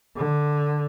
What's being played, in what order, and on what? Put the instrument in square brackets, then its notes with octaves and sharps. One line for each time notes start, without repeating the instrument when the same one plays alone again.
[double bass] D3